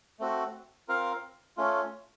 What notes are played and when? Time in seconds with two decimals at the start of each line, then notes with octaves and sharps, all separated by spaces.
0.20 A3 C4 F#4
0.89 C4 F4 A#4 F5
1.57 A3 C#4 F4